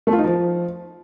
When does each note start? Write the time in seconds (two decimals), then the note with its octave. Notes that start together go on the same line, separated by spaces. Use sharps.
0.07 A3
0.13 F4
0.18 D#4
0.24 F3